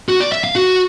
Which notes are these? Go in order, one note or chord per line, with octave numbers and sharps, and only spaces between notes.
F#4
D5
E5
F5
F#4